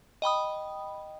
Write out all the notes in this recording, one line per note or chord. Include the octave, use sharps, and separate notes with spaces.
D#5 G5 B5 D#6